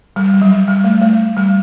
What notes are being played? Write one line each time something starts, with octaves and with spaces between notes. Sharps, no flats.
G3
G3
F#3
G3
A3
A3
G3